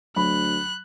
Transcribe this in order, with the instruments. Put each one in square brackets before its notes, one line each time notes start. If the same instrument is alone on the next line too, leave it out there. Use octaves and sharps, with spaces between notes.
[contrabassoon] D2 [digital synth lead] F#3 [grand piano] B5 [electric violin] F#6